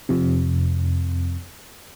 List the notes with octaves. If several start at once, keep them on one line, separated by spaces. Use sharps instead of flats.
F2 C3